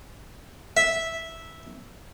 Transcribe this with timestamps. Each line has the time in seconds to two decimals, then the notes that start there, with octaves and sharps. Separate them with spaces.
0.77 E5